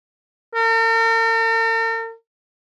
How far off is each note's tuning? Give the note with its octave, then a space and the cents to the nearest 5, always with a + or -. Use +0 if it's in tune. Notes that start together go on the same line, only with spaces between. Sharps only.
A#4 -45